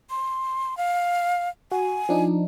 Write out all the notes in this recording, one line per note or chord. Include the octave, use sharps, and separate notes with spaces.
C6
F5
F#4 G#5
F3 D4 D#4